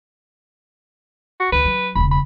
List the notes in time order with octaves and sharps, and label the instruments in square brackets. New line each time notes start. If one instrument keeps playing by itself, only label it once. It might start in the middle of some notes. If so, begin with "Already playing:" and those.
[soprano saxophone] F#4
[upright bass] D2 D#3 [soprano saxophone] B4
[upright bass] F#3
[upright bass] E1 C#3 [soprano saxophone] B5
[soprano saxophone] B5